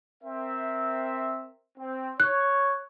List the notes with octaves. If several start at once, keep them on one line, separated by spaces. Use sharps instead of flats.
C4 A#4 E5
C4
C#5 F#6